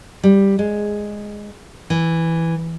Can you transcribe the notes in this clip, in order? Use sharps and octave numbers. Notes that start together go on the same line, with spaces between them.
G3
G#3
E3